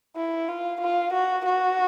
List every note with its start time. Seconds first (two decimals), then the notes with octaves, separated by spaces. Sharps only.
0.17 E4
0.49 F4
0.81 F4
1.13 F#4
1.45 F#4